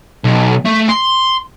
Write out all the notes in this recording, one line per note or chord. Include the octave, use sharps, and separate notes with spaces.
B1
A3
C6